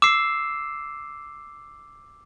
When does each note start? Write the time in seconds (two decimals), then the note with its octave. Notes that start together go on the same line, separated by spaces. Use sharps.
0.02 D6 E6 C7